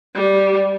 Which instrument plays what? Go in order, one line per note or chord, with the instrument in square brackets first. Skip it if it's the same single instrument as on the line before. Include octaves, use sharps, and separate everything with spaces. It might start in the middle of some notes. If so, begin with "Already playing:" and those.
[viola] G3